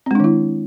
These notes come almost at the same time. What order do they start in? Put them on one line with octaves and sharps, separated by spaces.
C4 G#3 D4 D#3 E4